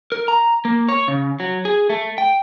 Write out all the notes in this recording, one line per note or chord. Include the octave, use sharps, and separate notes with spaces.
A#4
A#5
A#3
C#5
C#3
F#3
G#4
A3
G5